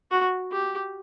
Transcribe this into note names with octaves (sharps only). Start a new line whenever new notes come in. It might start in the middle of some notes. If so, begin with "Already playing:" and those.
F#4
G4